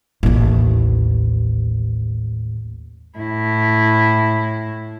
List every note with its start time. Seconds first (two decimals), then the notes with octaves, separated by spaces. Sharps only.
0.23 A1 D#2
3.18 A2 E4